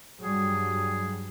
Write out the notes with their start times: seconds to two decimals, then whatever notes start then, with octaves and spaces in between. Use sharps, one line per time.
0.22 G2 F#3 G3 G#4